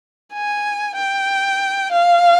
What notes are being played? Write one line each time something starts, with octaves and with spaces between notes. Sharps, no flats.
G#5
G5
F5